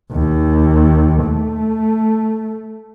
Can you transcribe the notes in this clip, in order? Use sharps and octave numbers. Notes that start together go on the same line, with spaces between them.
D#2
A3